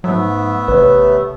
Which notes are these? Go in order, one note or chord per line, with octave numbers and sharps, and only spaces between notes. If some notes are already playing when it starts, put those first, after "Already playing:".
G#2 F#3 A3 B3 E5
A1 C3 B4 C#5